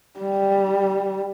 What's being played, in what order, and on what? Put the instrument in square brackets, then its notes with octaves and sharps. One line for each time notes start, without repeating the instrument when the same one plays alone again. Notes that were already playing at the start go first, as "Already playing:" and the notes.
[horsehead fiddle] G3